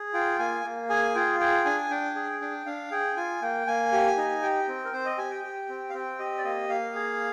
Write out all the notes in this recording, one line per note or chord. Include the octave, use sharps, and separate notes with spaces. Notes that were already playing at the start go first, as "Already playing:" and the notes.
Already playing: G#4
F4 G5
A#3 G#5
A#3
G#4 G#5
F4 G5
G#4 G5
D4 G#5
D4 G5
G#4
D4 G5
D4 F5
G#4 G5
F4 G#5
A#3 G5
A#3 G#5
G4
D#4
G4 G5
C4
A#4
C4 C5
D#5
G4 G#5
G5
G4
C4
F5
C4 G5
G4 D#5
D5
A#3 D#5
A#3 F5
G#4